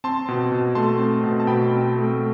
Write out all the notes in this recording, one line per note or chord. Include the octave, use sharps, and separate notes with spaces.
C4 A5 C6
B2
B2
A3 A5 C6
C4
B2
A5
B2 G5 B5
C4
A3